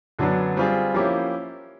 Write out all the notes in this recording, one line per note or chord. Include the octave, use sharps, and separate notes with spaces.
F#2 D3 F#3 B3 D4
G3 C4 F4 G#4
F3 A#3 C#4 E4 G4